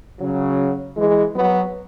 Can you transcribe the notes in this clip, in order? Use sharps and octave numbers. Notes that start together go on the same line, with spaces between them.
C#3 F#3
E3 G#3
F#3 B3